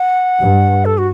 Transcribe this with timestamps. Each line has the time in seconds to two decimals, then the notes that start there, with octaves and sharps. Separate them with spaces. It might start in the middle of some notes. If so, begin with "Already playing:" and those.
Already playing: F#5
0.38 G2
0.85 A4
0.98 F#4